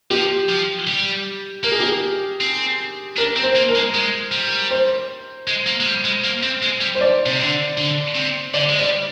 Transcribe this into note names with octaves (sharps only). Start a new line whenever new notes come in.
F3 G4
F3
G3
A#3 A#4
G#4
G4
G#4
C4
D4 A#4
C4
C5
A#3
A#4
G#3
G#3
G3
C5
G#3
A#3
G#3
G3
G#3
A#3
C4
G#3
G3
C5
D5
C3
D3
D3
C3
D3 D5
G#3
G3 D5